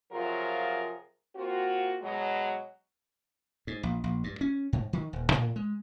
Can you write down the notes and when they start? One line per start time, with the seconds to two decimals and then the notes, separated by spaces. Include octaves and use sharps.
0.12 C3 F3 F#3 F4 G#4 A#4
1.36 A#3 C4 F4 F#4
2.02 B2 F#3 G#3
3.67 G#2
3.83 A#1
4.04 A#1
4.24 G2
4.41 C#4
4.73 G#2
4.93 D#3
5.13 D#1
5.32 A2
5.56 G#3